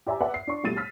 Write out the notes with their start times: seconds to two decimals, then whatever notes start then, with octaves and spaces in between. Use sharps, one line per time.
0.06 G4 D5 E5 G#5 A#5
0.21 B4 D5 E5 F#5
0.34 C7
0.47 D4 C#6
0.63 B2 G3 A3 A6 D#7
0.76 E6 F6 B6